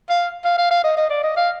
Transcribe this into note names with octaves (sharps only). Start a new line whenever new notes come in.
F5
F5
F5
F5
D#5
D#5
D5
D#5
F5